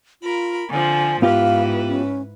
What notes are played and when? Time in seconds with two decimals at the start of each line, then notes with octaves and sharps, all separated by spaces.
0.22 F4 A#4 B5
0.70 D3 F3 C4 G#5
1.22 G#2 B3 E4 F4 G4 B4 F5
1.87 C#4